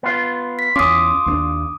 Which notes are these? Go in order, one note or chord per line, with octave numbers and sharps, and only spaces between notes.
B3 F4
B6
E2 C#4 F4 D6 D#6
D#2 B3 D4